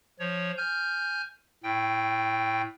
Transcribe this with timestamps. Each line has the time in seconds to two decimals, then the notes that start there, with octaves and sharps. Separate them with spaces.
0.19 F3 C#5
0.57 G#5 F6 G6
1.63 A2 G5